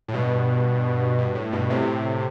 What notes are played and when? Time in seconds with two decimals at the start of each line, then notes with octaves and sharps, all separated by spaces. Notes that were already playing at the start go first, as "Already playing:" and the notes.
0.08 A2
0.14 G2 B2
1.18 G2
1.35 A2
1.53 G2 B2
1.70 A2 C3